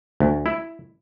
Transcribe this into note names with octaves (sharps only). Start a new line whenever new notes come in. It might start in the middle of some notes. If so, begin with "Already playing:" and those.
D2
E4